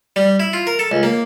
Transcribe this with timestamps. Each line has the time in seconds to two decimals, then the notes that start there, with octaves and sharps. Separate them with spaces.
0.16 G3
0.40 E4
0.53 F4
0.67 A#4
0.79 A4
0.91 C#2
1.03 A#3